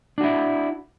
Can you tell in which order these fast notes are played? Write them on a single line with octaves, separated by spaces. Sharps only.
D4 F#4 E4